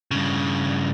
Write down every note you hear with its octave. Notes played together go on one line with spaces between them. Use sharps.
G2 C#3